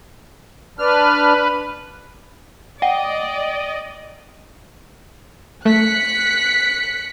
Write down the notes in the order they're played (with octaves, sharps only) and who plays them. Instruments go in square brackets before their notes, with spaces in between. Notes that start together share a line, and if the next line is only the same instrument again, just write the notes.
[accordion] D4 F6 [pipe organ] B4
[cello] D5 [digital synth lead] D#5 [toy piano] F#5 [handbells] G5
[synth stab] A3 [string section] F#6 B6 C#7